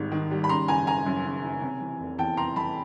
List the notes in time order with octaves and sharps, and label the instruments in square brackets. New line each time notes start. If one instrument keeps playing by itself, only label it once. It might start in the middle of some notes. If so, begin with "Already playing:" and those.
Already playing: [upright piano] G#1 G#2 D#3 G3
D#3
G3
B5
C#3 A#5 C6
F#1 G#5 A#5
F#1 G#5 A#5
F#2
C#3
F#1
C3
E3
F1
E2 G5 A5
C3 A#5 C6
E3 A5 B5